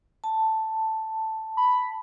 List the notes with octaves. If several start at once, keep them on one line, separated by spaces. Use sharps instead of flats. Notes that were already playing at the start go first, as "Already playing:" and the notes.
A5
B5